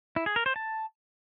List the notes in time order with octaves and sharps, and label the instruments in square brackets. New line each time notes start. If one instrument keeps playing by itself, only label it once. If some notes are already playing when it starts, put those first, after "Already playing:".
[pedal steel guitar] E4
G#4
A#4
C5
A5